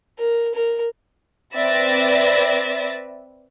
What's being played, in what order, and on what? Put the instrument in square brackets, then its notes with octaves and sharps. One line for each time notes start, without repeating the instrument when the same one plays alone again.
[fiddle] A#4
A#4
[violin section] C4 B4 D5 E5 A6 A#6